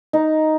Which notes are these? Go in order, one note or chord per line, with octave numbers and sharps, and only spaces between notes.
D#4